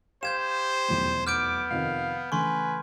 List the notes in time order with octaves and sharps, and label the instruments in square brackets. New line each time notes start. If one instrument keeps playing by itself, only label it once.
[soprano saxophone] G4 [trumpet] C5 [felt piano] F5 [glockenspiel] G6 G#6 E7
[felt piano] F1 B1 E2
[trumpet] B3 [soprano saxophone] D6 [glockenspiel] F6 G6 D7
[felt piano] F2 C3 D#3 [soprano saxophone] F5
[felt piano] C#3 E3 A3 [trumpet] B4 [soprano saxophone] G#5 [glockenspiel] C6 C#6